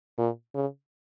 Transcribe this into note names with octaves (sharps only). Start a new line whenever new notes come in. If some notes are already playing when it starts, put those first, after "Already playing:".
A#2
C#3